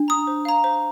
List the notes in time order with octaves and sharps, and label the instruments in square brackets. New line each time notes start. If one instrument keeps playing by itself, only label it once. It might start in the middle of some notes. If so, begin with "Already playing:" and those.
Already playing: [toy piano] D4
[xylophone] A#5 D#6
C5
F5 A#5
C5